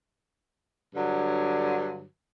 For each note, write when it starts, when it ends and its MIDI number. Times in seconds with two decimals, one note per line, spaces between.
0.94 2.03 43
0.94 2.03 50
0.94 2.03 54